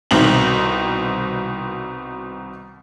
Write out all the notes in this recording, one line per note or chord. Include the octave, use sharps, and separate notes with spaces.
C2 B2 D#3 C4 F#7